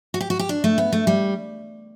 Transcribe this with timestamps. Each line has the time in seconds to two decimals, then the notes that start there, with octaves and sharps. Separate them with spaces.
0.14 F#4
0.21 G4
0.30 F#4
0.39 G4
0.49 D4
0.64 A3
0.78 B3
0.93 A3
1.07 G3